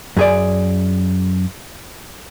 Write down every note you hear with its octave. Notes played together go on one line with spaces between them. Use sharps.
F#2 G#4 D5